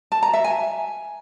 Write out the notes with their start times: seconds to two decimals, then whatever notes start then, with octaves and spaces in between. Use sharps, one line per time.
0.12 A5
0.23 A#5
0.33 E5
0.44 G#5